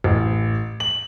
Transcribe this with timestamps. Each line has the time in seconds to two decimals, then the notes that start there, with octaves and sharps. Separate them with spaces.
0.04 A1
0.80 F#7